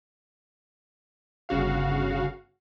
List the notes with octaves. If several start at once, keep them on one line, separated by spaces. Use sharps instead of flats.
G1 C#3 F#4 F5